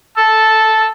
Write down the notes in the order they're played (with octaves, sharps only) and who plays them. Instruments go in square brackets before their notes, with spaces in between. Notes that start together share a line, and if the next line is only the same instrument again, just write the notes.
[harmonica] A5 E6